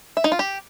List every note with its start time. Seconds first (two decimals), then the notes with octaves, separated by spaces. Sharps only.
0.17 E5
0.24 D#4
0.32 F4
0.39 G4